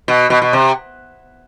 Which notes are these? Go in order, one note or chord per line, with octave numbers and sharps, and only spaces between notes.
B2
B2
B2
C3